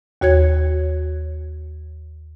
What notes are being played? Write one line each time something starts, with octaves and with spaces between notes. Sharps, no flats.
D#2 F#4 C#5 G#6